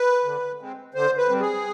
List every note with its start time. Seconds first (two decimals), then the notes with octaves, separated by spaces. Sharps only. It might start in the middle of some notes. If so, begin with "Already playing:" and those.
Already playing: B4
0.24 D3
0.60 G#3 C4
0.94 D3 C5
1.17 B4
1.29 G3 C4
1.41 G#4